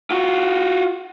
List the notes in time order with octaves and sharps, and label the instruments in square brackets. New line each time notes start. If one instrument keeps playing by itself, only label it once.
[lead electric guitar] F4 F#4